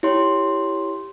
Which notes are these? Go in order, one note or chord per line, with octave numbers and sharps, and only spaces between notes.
E4 G4 C#5 C6